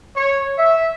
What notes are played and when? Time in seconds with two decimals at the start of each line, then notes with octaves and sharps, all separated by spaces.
0.16 C#5
0.57 E5